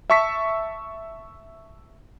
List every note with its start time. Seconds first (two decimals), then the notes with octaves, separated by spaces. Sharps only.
0.10 E5 A5 C#6 E6 B6